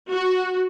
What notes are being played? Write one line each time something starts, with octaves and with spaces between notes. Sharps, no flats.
F#4